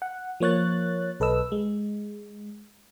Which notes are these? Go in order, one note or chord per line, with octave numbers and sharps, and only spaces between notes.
F#5
F3 A#3 C#5 F#6 A6
B1 A4 B4 D#5 E6
G#3